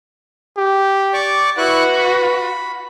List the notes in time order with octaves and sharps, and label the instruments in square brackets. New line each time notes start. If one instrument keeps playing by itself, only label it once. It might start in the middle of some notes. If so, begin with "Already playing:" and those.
[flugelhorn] G4
[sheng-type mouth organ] D5 C#6 D6
[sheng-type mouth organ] E4 C#6 F#6 [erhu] F#4 [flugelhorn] B4
[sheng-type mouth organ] B5